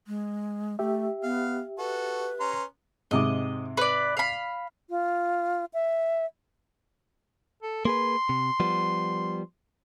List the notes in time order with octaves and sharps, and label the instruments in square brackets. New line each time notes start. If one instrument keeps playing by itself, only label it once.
[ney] G#3
[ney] A3 [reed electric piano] G4 E5
[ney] B3 [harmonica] F5
[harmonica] F#4 A4 [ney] B4
[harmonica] C#4 A#5 C6
[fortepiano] G#2 C3 D6 [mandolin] D#5
[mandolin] B4 D5
F5 B5
[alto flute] F4
E5
[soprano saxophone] A4
[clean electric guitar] A#3 G#4 B4 [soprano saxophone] C6
[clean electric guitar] C3
F3 G3 B3